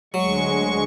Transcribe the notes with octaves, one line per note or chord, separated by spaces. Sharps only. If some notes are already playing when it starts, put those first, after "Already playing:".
D2 F#3 G#3 C#6